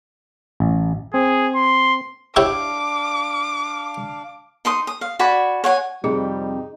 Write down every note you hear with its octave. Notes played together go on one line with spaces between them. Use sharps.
A1
C4 G#4
C6
D4 E4 G4 C#5 F5 D6
D#4 C6 D#6
D#6
F5
F#4 D5 G#5 B5
C#5 F#5 G#5
F2 C3 G3 D#4 G4 G#4